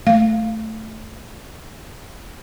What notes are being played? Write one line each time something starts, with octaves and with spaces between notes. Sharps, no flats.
A3 F5